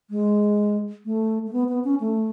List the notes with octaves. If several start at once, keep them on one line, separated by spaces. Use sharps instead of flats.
G#3
A3
A3
B3
B3
C#4
A3